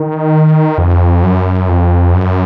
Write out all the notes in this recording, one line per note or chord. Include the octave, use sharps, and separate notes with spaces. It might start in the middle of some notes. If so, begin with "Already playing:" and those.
Already playing: D#3
F2
F#2
F2
F#2